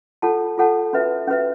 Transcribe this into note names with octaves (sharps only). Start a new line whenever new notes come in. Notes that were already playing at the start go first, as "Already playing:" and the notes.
F4 A4 C#5 F#5 A5
F4 A4 C#5 F#5 A5
C#4 F#4 B4 E5
C#4 F#4 B4 E5